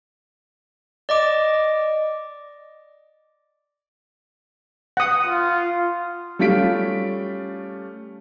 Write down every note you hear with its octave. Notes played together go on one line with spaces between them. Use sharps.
D5 D#5 D6
F#5 D#6
F4
G3 A3 C#4 F4 B6 D7